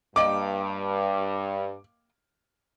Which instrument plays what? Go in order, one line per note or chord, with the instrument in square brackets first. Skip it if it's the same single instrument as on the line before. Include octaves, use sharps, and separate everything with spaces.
[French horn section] G2 [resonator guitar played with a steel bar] A#3 D#5 G5 [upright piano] D6